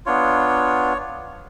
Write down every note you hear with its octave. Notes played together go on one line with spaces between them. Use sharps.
B3 D4 F4 C#5